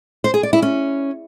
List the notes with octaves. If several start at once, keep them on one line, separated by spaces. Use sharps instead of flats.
C5
G#4
D5
E4
C#4